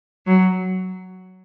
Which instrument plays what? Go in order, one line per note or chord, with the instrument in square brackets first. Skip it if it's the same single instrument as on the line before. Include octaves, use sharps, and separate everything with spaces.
[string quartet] F#3